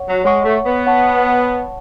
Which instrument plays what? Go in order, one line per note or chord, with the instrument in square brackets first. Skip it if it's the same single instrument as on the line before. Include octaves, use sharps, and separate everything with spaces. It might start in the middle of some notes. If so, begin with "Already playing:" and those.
Already playing: [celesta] C#5 F#5 C#6
[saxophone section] F#3
[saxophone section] G#3 [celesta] C#5 F#5 C#6
[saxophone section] A3
B3
[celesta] C#5 F#5 A5 C#6